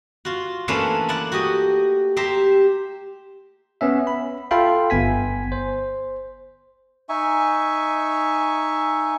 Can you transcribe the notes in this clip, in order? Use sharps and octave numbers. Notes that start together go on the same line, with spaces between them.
F4 F#4
E3 A3 A#3 C#4 D4 E4
E4 D5 F#5
F#4 G4 D#5
G4 C5 E5 A#5
B3 C#4 E5
B5
F4 A4 E5 F5 G5 B5
G1 B3 G#5 B6
C5
D#4 E5 G#5 C#6